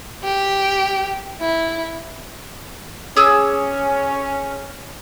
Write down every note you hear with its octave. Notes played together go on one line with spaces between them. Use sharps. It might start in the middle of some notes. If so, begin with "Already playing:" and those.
G4
E4
C#4 G#4 D6 E6